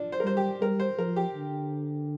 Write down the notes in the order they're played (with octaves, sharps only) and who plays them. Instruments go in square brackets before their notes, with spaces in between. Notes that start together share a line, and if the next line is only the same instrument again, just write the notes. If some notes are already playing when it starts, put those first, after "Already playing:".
Already playing: [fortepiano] F3 D4
C5
A#4
[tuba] G3 [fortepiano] C5
[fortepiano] G4
[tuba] G3 [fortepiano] A#4
[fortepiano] C5
[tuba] F3 [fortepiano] A#4
[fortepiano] G4
[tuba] D3